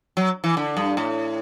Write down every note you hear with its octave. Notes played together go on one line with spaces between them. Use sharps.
F#3
E3
D3
G2
A2